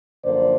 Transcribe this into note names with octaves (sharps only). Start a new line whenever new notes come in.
F#2 D3 F3 A#3 C5 D5